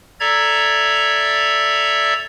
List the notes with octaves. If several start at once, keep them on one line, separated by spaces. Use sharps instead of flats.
A4 D5 E5 A#5 G#6